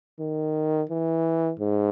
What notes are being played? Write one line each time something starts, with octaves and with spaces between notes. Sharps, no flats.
D#3
E3
G#2